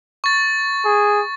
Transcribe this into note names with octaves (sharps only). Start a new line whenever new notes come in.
C#6 A6
G#4